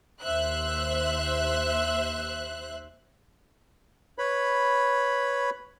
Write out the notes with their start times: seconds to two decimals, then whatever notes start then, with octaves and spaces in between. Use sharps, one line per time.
0.22 D#2 C5 E5 F#6
4.18 B4 C#5 B5